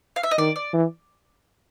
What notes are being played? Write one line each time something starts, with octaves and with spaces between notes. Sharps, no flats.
F5
E5
D#5
D#3 D5
D5
E3